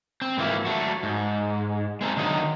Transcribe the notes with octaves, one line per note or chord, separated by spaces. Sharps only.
C4
G#2 E3 F3 A#3 E4
F#3 A3 F#4
G#2
G#3 C4 D#4 A4
D3 D#3 F#3 D#5